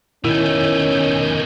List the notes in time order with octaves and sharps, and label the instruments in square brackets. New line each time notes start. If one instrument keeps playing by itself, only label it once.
[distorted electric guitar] B2 A3 [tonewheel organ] D#3 G#5 G6 [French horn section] C#4 [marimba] E4